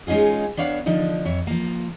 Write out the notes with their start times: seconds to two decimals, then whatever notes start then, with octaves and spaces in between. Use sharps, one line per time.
0.07 G#3 C#4 D#4 F4 G#4
0.57 B3 D4 C#5 F5
0.86 D3 F3 D4 D#4
1.25 F2 C#5 E5
1.47 F3 A#3